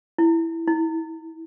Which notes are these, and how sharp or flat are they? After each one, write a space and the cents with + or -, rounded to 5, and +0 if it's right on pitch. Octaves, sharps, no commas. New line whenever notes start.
E4 +5
E4 -30